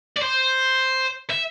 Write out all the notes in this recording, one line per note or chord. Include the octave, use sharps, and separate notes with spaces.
D5
C5
E5